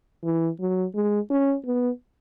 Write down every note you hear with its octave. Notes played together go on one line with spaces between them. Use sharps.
E3
F#3
G#3
C#4
B3